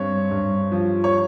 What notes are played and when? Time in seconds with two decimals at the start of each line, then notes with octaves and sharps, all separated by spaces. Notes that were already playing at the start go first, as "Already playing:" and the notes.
Already playing: G2 C4 C#5
0.31 G2
0.72 F3
1.04 C#5